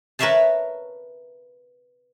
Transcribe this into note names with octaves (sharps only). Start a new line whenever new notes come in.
A#4 B4 C#5 E5 F5 A5